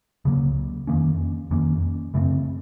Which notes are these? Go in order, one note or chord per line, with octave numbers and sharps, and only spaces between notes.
C#2 C#3 F#3 A#3
F2 D#3 A#3 C#4
F2 D#3 A#3 C#4
F#2 C#3 A3 C4